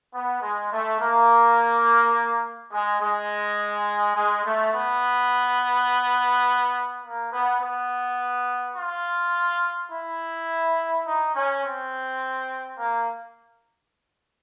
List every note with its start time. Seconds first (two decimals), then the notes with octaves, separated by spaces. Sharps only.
0.14 B3
0.42 G#3
0.71 A3
0.99 A#3
2.73 G#3
3.01 G#3
4.16 G#3
4.44 A3
4.73 B3
7.03 A#3
7.33 B3
7.61 B3
8.76 F4
9.92 E4
11.07 D#4
11.35 C#4
11.64 C4
12.79 A#3